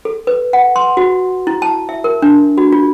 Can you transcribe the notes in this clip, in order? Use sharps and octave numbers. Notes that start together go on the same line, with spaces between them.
A4
B4
F#5
C6
F#4
E4
A5
E5
A#4
D4
F#4
F4